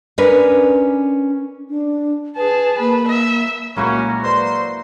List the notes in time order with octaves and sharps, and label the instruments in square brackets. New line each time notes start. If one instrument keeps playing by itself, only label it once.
[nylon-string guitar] C#4 D4 A#4 B4
[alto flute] D4
[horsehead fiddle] G#4 A5 [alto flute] B4
[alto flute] A#3 [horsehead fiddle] B4
[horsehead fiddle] E5
[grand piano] A#2 F#3 G#3 [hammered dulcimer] A#3 E4 F#4 [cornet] C#4
[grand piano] B4 D5 A#5 [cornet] C5 [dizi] C6